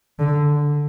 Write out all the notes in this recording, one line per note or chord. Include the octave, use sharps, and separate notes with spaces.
D3